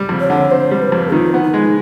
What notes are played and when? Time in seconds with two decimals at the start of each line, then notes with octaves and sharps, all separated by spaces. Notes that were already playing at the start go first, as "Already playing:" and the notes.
Already playing: G3
0.09 F2
0.20 C#5
0.30 D3
0.51 C4 C5
0.71 G3
0.82 B4
0.92 F2
1.12 D#3 F4
1.34 B3
1.43 D#4
1.54 G#3